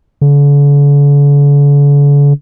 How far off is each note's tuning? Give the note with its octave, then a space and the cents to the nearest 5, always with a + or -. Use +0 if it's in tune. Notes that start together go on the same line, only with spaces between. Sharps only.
D3 -45